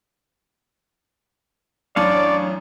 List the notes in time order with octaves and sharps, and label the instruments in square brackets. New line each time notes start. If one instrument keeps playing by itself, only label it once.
[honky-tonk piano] A1 F#2 A5 [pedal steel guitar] D4 C#5 F5 [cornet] D5